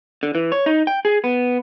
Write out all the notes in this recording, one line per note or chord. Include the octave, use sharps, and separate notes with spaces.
D3
E3
C#5
D#4
G5
G#4
B3